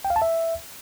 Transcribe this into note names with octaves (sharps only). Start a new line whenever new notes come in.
G5
F5
A5
E5